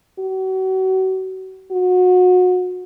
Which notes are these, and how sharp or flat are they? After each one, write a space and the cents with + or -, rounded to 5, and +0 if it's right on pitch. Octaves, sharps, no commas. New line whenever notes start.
F#4 +35
F#4 -25